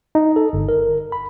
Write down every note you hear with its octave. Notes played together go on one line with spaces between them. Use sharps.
D#4
A4
G1
A#4
B5